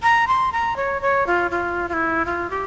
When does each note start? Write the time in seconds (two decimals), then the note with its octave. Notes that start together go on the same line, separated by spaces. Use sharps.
0.03 A#5
0.28 C6
0.52 A#5
0.76 C#5
1.02 C#5
1.27 F4
1.51 F4
1.89 F4
1.93 E4
2.25 F4
2.50 G4